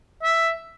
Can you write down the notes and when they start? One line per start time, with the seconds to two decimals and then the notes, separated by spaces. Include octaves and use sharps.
0.23 E5